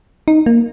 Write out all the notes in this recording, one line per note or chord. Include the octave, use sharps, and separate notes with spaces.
D#4
A#3